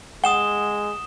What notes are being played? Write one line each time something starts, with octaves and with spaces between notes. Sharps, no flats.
G#3 F#5 D#6 E7 G7